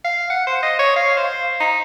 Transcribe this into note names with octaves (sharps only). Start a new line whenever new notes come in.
F5
F#5
C5
D#5
C#5
F5
C5
D#4